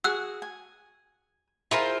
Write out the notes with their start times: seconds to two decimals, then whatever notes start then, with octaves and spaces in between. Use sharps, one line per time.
0.04 F#4 G#4 E6 F#6
0.42 G#5
1.71 E4 F4 G#4 A#4 C5